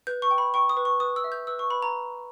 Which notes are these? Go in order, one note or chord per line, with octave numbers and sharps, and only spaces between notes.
B4 G6
C#6
G5
B5
G5 C#6
D#6
B4
C#6
B4 D#6
E6
E5
G6
B4 E6
C#6
B4 B5
A#5